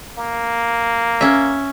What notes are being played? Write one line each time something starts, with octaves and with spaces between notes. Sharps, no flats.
A#3
C#4 E5